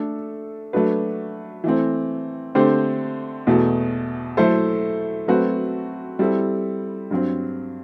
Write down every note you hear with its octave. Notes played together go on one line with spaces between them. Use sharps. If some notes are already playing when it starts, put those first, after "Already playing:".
Already playing: A3 D4 A4
F#3 A3 D4 F#4 B4
E3 A3 C4
D3 A3 C4 G4 C5
E2 B2 A3
F#3 A3 E4 A4 C5
F#3 A3 C4 F#4 B4
G3 C4 E4 A4
G2 F#3 C4